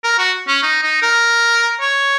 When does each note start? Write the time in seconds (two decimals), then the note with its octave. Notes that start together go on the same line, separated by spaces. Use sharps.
0.04 A#4
0.19 F#4
0.48 C#4
0.63 D#4
0.83 D#4
1.02 A#4
1.81 C#5